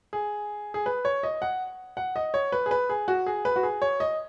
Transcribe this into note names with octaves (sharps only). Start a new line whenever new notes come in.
G#4
G#4
B4
C#5
D#5
F#5
F#5
D#5
C#5
B4
G#4
B4
G#4
F#4
G#4
B4
F#4
G#4
C#5
D#5